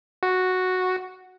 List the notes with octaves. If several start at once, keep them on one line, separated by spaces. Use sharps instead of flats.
F#4